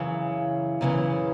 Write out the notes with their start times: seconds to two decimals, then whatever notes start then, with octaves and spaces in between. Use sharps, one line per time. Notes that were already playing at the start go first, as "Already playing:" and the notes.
Already playing: F#2 C#3 E3
0.81 F#2 C#3 E3